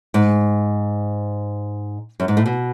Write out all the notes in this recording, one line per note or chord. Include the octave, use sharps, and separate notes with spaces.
G#2
F#2
G#2
A2
B2